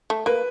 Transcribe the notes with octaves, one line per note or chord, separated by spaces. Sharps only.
A3
A#3 B4